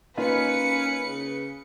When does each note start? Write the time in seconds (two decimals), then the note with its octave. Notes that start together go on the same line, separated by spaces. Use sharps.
0.18 A#3 C#4 D#4 F4 B4 C#7
1.05 C#3